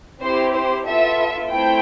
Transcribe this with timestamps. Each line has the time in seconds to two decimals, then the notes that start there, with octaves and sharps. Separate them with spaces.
0.21 C4 E4 G4 C5
0.53 C5
0.86 B3 F4 A4 E5
1.51 A3 C4 E4 G5